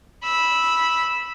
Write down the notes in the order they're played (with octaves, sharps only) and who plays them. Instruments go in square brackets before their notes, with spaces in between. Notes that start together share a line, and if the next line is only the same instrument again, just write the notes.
[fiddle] B5 E6